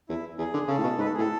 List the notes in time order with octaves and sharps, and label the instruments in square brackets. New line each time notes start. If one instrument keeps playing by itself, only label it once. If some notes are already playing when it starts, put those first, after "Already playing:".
[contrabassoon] E2 [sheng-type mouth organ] E4
[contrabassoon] E2 [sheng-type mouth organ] G#4
[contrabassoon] D3
[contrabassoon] C#3 [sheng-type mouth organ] A4
[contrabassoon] A2
B2
[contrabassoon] G#2 [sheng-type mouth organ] B4
[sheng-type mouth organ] A4
G#4
[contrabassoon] A2 [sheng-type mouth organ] A4